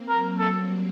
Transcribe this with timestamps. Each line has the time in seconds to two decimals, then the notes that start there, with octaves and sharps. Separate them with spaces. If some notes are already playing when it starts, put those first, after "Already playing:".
Already playing: A#3 C4
0.08 F#3 A#4
0.39 A4
0.55 G3